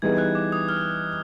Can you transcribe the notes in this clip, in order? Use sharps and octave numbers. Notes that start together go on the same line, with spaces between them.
E3 G3 B3 D#4 G#4 G#6
F#6
D6
D#6
F6